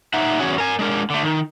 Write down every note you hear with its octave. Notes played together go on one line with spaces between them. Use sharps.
D#4 E5 F#5
E2 C#4 F#4 G#4 C#5 F#5
A#4 G#5
G#3 D4 A#4
D3 A3
D#3